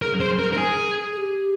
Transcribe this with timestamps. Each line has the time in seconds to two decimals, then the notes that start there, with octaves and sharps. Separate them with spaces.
0.02 G#4 A#4
0.20 C5
0.39 A#4
0.53 A#4
0.57 G#4
1.12 G#4
1.17 G4